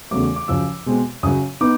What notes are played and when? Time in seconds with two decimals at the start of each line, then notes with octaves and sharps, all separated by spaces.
0.11 E2 C#3 F#3 A3 D6
0.23 D6
0.36 D6
0.48 F#2 C#3 F3 E6
0.86 B2 G#3 C4
1.23 F#2 C#3 F#3 D#6
1.61 B3 D#4 D6